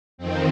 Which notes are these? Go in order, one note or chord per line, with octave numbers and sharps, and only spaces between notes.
F2 D#3 C4